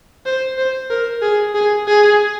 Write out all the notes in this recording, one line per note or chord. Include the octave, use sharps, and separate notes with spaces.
C5
C5
A#4
G#4
G#4
G#4